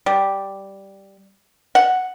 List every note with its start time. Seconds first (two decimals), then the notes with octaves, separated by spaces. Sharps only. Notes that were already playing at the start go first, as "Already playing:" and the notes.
0.06 G3
1.75 F#5